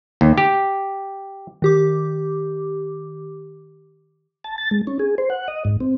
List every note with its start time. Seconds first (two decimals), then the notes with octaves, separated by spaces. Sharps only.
0.21 D#2
0.38 G4
1.62 D#3 G4 D6
4.44 A5
4.58 A6
4.71 G#3
4.87 C#4
4.99 G#4
5.18 C5
5.30 F#5
5.48 D#5
5.65 G#2
5.80 C4